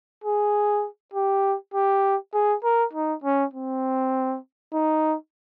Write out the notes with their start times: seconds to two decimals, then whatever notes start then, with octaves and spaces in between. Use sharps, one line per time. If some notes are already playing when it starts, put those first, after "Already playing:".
0.24 G#4
1.14 G4
1.74 G4
2.34 G#4
2.64 A#4
2.94 D#4
3.24 C#4
3.54 C4
4.74 D#4